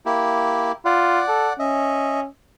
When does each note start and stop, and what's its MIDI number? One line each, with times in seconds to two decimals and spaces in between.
0.06 0.72 58
0.06 0.72 64
0.06 0.72 67
0.85 1.21 65
0.85 1.53 74
0.85 1.53 78
1.28 1.49 69
1.59 2.26 61
1.59 2.20 75
1.59 2.20 76